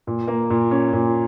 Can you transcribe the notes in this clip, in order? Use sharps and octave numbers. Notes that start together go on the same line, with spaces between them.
A#2
A#3
A#2
C#4
A#2